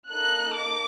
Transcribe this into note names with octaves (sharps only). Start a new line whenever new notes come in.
A#3 D#4 A4 F#6
D6